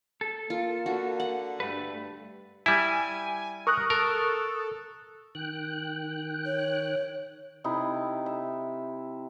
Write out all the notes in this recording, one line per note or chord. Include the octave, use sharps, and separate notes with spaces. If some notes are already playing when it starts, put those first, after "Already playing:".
A4
A#3 F4
D3 F#4
F#5
G2 A3 B4
G3 E4 G#5
A#4 C#6 D#6 F#6
A4 A#4
D#3 G5 F#6
C#5
C3 D#4 E4
E5